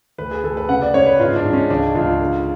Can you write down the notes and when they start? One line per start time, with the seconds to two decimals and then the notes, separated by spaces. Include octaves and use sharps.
0.18 D2 B4
0.31 G#4
0.43 D2 A4
0.57 B4
0.69 C#3 F#5
0.82 D5
0.94 C#3 C#5
1.06 B4
1.19 G#2 F4
1.36 D4
1.44 G#2
1.53 C#4
1.70 C#2 D4
1.95 C#2 F4
2.21 D3